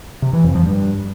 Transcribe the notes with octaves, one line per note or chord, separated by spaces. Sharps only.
C3
E3
F2
F3
G2